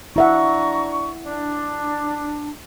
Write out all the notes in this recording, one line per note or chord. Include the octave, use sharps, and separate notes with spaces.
D4 E4 E5 F#5 A#5 C#6
D4